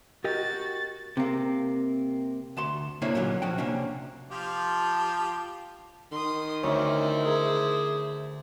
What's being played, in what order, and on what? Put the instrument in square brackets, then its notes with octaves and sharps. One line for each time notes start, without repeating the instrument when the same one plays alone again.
[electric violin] F#4 A6 [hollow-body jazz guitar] G4 A#4 D#5
[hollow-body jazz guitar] C3 A#3
D2 A5 C6
C3 A#3 D4 E4 C#5
A#2 D3 E3 F#3 C#4
F3 C#4 F#4 G5
C3 A#3 C#4 D4
[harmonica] F3 F4 G4 [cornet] A5
[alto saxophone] D#3 [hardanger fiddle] C6 D#6
[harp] D2 [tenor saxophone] C#4 [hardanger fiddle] E4 C5
[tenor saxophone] G#4 [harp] A#4